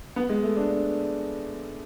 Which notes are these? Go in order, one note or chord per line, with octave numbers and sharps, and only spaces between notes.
B3
G#3
A3
D4
D4